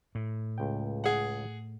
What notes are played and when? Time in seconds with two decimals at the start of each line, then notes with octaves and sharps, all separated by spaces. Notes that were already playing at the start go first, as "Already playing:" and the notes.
0.15 A2
0.58 C#2 G5
1.04 G#4 F#5